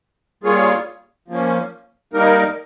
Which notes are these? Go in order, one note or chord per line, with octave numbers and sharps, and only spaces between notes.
G3 A#3 F4 G#4 C#5
F3 A#3 C#4
G3 A#3 D#4 A#4